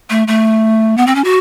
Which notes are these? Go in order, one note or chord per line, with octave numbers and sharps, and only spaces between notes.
A3
A3
B3
C4
C#4
F#4